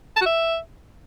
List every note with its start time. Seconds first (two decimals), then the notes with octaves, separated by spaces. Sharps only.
0.16 A5
0.21 F#4
0.26 E5